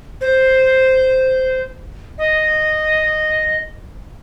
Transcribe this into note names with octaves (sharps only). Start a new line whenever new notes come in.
C5
D#5